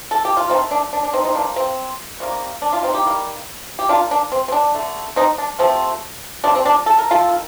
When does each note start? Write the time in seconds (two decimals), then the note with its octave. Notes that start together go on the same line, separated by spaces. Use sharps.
0.11 A4
0.25 G4
0.37 F4
0.49 D#3 A3 C4 D#4
0.71 D4
0.93 D4
1.03 D4
1.13 C4 D#4
1.24 C4 D#4
1.35 C3 F3 A#3 D4
1.56 C4
2.20 C3 D#3 G3 A#3
2.62 D4
2.72 D4 F4
2.83 C4 D#4
2.93 D#4 G4
3.05 D#3 G3 A#3
3.79 G4
3.89 D#3 A#3 D4 F4
4.11 D4
4.32 C4
4.48 C4
4.52 D4
4.75 D3 A3
5.16 C4 D#4
5.38 D4
5.59 C3 F3 A3 C4
6.44 C3 F3 A3 D4
6.55 C4
6.65 D4
6.86 A4
6.99 A#4
7.11 F4 A4
7.29 D#3